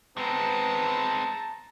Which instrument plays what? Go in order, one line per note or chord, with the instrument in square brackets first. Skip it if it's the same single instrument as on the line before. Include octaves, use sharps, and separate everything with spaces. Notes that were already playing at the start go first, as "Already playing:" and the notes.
[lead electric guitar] G#3 C4 [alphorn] B3 [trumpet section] A5 [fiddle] A#5